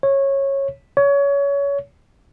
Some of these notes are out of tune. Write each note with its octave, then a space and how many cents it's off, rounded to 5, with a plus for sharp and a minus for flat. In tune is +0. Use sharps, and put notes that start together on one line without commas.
C#5 -15
C#5 +25